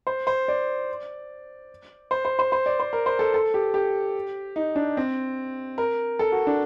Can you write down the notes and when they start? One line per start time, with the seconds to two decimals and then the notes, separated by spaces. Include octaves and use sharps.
0.07 C5
0.27 C5
0.48 D5
2.11 C5
2.25 C5
2.39 C5
2.52 C5
2.66 D5
2.80 C5
2.93 A#4
3.06 C5
3.19 A4
3.34 A4
3.54 G4
3.74 G4
4.56 D#4
4.76 D4
4.97 C4
5.78 A#4
6.19 A4
6.32 F#4
6.47 D4